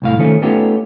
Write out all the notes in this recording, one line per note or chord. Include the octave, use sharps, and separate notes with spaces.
C2 A2 F5
D#3 F3 A3 C#4
A3 B3 C#4 D#4 F4 G4